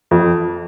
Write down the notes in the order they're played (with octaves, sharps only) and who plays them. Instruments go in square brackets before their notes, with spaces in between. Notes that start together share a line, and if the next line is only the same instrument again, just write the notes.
[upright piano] F2